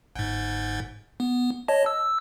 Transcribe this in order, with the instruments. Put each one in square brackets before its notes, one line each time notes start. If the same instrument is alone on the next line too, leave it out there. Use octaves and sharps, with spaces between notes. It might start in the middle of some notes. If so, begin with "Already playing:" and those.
[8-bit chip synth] G1 G#2
B3
C#5 D#5 A5
E6